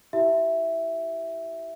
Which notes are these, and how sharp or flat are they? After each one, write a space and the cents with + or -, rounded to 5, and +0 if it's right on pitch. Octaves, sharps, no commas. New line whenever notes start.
E4 -20 G4 -35 E5 +0